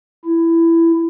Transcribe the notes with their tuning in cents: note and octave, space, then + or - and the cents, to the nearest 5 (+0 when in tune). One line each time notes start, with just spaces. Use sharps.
E4 +15